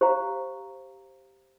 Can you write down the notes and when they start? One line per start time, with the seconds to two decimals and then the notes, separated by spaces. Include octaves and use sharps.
0.01 G4 C5 F5 A#5